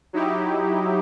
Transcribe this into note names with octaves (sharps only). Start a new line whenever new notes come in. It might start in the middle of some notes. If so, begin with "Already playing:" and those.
F#3 D#4 E4 G4